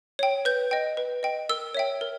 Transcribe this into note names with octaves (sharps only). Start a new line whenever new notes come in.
C#5 G5
B4 G6
D#5 G5
B4
D#5 G5
A#4 E6
C#5 E5 G5
A#4